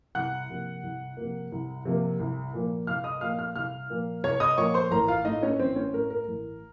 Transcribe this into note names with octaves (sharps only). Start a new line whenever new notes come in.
C2 F#5 F#6
C3 F3 A#3
C2
C3 F3 A#3
C2
C3 F3 A#3
C2
A#2 F3 A#3
C2 F5 F6
D#5 D#6
A#2 F3 A#3 F5 F6
F5 F6
C2 F5 F6
A#2 F3 A#3
C2 C#5 C#6
D#5 D#6
A#2 F3 A#3 C#5 C#6
C5 C6
A1 A#4 A#5
F4 F5
A2 A3 D#4 D#5
C#4 C#5
A1 C4 C5
C#4 C#5
A2 A3 A#4
A#4
A1